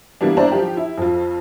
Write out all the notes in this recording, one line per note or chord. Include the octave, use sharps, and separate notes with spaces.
E3 G3 A#3 B3 D4
D4 E4 C5 D5 A#5
F3 F4 G4
E4
F2 F4